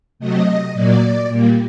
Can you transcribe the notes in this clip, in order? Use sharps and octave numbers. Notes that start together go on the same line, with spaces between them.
C3 F#3 A3 D#5
A#2 F#3 A#3 D5
A#2 G3 A#3